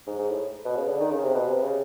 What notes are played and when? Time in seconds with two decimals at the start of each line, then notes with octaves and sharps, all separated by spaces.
0.07 G#2
0.18 G#2
0.30 A2
0.65 B2
0.76 C#3
0.89 D3
1.00 D#3
1.11 C#3
1.23 C3
1.34 B2
1.47 C3
1.62 C#3